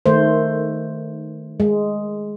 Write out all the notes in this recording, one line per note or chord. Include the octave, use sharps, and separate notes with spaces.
D#3 A3 C5
G#3